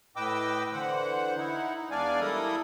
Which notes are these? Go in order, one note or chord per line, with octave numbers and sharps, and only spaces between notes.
A2 B4 D#5 G5 D6 E6
D3 E3 C5 F#5
D#4 E4 F#5
D#4
E2 G#3 D4 D5 F5 G#5
G3 E4 A4 A#4 D#6